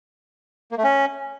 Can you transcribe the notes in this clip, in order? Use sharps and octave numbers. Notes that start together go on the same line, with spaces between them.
A#3
A3
C#4